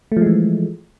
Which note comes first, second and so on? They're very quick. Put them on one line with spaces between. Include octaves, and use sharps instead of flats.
A3 F3 G#3 E3